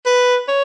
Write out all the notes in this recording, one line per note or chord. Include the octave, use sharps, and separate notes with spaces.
B4
C#5